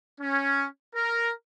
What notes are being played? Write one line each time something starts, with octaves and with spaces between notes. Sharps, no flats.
C#4
A#4